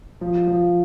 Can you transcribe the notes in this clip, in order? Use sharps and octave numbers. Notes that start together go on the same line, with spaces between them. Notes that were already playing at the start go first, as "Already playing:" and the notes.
F3
F3